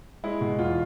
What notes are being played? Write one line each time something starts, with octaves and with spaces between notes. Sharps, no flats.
G#3 E4
B2
E2 F4